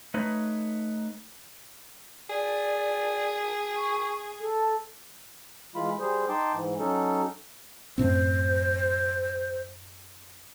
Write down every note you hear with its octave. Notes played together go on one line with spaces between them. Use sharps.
A3 D#4 B4 C#5
G#4 D5
C#6
A4
E3 G#3 F4 B5
G3 G#4 C5
D#4 G5 A5 C6 D6
G#2 E3
F#3 C#4 D#4 A4
F#2 A2 C4 C5